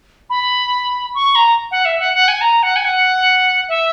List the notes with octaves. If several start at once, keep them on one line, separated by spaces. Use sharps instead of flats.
B5
C#6
A#5
F#5
E5
F#5
F#5
G#5
A#5
F#5
G#5
F#5
E5